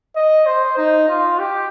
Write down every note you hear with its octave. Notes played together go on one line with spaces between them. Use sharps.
D#5
C5
D#4
F4
G4